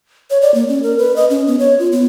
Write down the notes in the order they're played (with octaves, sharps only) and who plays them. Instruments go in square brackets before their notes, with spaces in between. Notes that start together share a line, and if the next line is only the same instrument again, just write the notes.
[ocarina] C#5
D5
A#3
C#4
A#4
B4
D#5
C#4
B3
C#5
F4
B3